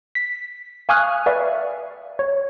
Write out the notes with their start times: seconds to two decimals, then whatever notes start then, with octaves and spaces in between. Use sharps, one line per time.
0.15 B6
0.89 F5 G#5 C#6 D#6 F6 F#6
1.26 B4 D5 E5 F5 C#6
2.19 C#5